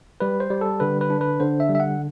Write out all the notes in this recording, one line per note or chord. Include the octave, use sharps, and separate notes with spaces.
G3 B4
C5
G3
A4
D3 B4
B4
D4
B4
D3 C5
E5
G3
E5
F#5